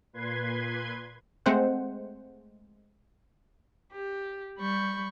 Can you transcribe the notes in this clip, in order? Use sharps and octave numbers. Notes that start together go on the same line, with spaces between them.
A#2 B4 C6 G#6
G#3 A3 C4 C5 F#5
G4
G3 B5 C#6 G6